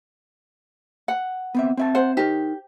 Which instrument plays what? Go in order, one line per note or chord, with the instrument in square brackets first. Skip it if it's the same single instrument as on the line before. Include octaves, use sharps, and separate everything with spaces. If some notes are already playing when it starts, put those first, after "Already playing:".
[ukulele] F#5
[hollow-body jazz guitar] B3 C4 E5
C4 E5 A5
[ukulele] C5 F#5
[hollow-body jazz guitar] D#4 A#4 [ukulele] G4